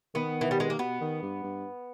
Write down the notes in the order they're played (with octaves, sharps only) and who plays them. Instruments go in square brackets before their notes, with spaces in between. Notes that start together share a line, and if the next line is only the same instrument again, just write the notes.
[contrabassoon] D#3 [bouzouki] B3
[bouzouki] E3
G3
G#3
A#3
[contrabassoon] B2 [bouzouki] B3
[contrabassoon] D#3
G2
G2